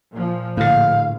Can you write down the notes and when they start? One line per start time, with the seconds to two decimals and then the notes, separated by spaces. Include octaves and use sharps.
0.12 A#2 F3
0.57 A#1 A2 D3 F5